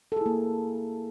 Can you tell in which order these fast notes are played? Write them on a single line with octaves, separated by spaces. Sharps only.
A4 G#4 E4 A#3